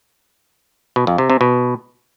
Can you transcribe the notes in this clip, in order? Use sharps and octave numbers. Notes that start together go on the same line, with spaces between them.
B2
F2
C3
C3
B2